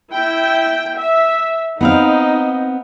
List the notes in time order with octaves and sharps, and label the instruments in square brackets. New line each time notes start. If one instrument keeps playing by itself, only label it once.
[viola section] E4 G5
E5
[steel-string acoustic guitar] B3 C4 F5 [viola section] D#4